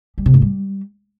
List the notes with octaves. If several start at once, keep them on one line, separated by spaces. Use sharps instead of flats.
G3
C3
G#2
G3